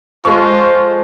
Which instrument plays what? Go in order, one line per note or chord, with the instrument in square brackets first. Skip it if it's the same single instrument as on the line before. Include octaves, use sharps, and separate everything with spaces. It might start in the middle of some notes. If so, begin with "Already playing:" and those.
[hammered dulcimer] F3 A4 [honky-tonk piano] G#3 C#6 [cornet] F4 [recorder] C5